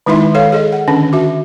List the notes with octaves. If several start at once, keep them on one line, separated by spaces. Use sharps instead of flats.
D#3 G#3 D#4 E4 E5 C6
A4 C#5 F5
G#4 A4 D#5
F#5
D3 D#3 C#4 D4
F#4 E5